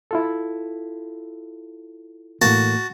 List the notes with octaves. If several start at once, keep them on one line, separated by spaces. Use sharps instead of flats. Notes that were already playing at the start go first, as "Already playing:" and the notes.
E4 F4 A4
A2 E3 A#3 F#4 A5